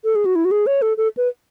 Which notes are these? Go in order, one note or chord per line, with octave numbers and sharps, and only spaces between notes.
A4
G#4
F#4
E4
F#4
G#4
C#5
A4
A4
B4